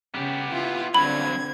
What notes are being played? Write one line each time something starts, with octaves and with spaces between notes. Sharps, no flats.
C#3 B3 G4
E4 F4
G2 D3 F#3 C4 B5 G#6